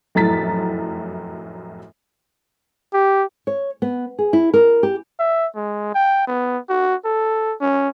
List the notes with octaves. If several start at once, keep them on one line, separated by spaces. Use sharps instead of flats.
F1 F#2 A2 A#5 A6 B6
G4
C#5
B3
G#4
E4
A#4
G4
E5
G#3
G5
B3
F#4
A4
C#4